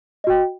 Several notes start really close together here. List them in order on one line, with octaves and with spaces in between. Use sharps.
D#5 F#4 G5